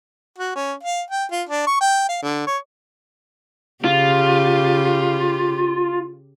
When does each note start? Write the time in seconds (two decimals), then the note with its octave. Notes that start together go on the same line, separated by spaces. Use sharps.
0.38 F#4
0.55 C#4
0.83 F5
1.10 G5
1.32 F4
1.49 D4
1.67 C#6
1.81 G5
2.09 F5
2.23 D3
2.47 C#5
3.85 C#3 F4 G4